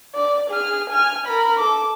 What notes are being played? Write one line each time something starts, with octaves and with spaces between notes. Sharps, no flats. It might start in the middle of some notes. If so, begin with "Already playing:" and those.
D5
G#4 F6
G#5 F6
A#4 B5
A4 D6